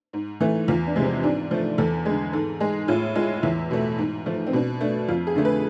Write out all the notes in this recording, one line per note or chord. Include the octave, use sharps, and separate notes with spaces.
G#2
E3 A3
E2 F4
D4
C3 F3 G#3
C4
G#2 D4
F3 A3
E2 A4
D3 G#3 G#4
G#2 A4
G#3 G#4
A2 F4
G#3 F4
E2 E4
B2 A3
G#2
F3 A3
C4
B2 D4
A3 D4
F2 F4
G#4
D3 A3
B4